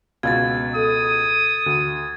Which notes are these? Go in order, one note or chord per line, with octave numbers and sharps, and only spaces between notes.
C#2 B2 F5 G#6 A6
A4 D#6
D2